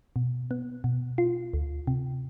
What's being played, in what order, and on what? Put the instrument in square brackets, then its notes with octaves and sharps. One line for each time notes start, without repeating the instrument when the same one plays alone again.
[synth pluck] B2
B3
B2
F4
D2
C3